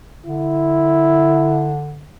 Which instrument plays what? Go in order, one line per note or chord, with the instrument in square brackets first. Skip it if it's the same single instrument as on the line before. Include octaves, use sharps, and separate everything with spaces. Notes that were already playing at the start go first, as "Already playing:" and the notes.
[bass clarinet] D3 [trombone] E4